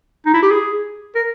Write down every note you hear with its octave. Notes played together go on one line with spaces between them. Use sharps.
D#4
E4
G4
G#4
A#4